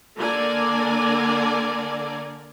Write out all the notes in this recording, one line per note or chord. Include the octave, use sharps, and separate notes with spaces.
D3 A#3 A#4 D5 G#5